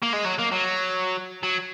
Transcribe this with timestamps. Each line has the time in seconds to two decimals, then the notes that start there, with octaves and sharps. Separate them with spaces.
0.03 A#3
0.13 G#3
0.26 F#3
0.39 A#3
0.52 F#3
1.43 F#3